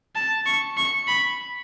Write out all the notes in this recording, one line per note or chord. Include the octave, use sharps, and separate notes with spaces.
A5
C#6
C#6
B5